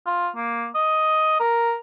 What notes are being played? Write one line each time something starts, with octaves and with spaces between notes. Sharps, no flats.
F4
A#3
D#5
A#4